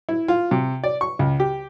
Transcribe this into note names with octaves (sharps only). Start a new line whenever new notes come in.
E4
F4
C3
D5
C#6
C#2
G4